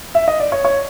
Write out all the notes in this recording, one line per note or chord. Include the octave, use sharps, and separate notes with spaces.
E5
D#5
D5
C#5
C#5